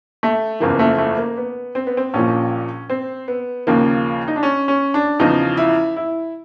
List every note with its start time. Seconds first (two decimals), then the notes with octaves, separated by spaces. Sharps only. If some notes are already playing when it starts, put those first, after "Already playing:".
0.23 A3
0.60 F#1 E2 C#3 F3 A#3
0.79 A3
0.98 A3
1.18 A#3
1.37 B3
1.75 C4
1.87 B3
1.97 C4
2.14 A#1 A#2 F3 C#4
2.90 C4
3.28 B3
3.67 D#2 C#3 F3 A#3
4.28 D#4
4.36 D4
4.43 C#4
4.68 C#4
4.94 D4
5.19 E2 C#3 F3 D#4
5.57 E4
5.96 E4